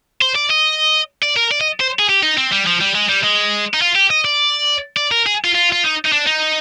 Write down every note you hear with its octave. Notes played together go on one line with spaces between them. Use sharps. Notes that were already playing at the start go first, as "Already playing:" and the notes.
C5
D5
D#5
D5
A#4
D5
D#5
C5
G#4
G4
D#4
C4
G3
F3
G3
G#3
G3
G#3
D#4
F4
G4
D#5
D5
D5
A#4
G#4
F4
F4
F4
D#4
D#4
D4
D#4